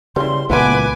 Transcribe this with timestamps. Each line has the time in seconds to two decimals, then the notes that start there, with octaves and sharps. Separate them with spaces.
0.16 C#3 E3 G3 C6
0.50 C#2 A#2 E3 A3 B3 B4 G#5 D6